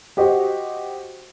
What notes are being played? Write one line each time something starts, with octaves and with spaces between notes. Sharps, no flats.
F#4 G4 C5 D#5